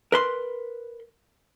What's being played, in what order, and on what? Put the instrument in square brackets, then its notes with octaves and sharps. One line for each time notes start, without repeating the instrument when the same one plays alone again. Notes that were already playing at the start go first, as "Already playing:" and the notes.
[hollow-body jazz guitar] A#4 B4 C6